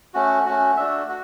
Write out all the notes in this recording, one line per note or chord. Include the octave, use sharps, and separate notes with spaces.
A3 C#4 F#4
A3 C#4 F#4
A3 D4 F#4 E5
F#4